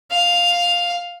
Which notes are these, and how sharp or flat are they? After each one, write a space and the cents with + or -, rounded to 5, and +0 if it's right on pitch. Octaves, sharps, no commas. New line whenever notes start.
F5 +5